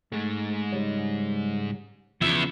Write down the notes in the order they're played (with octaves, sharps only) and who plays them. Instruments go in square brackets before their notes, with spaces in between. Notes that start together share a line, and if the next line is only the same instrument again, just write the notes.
[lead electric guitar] G#2 G#3 [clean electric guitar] A3
[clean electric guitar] C#2 G3 C#5
[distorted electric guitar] E2 E5 [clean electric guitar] C#3 F3 [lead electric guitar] B3